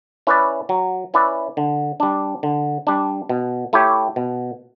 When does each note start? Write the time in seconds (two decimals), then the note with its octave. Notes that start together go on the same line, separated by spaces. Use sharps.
0.27 C#4 E4 B4 D5
0.69 F#3
1.14 C#4 E4 B4 D5
1.57 D3
2.00 G3 D4
2.43 D3
2.87 G3 D4
3.29 B2
3.73 A3 E4 G4 C#5
4.16 B2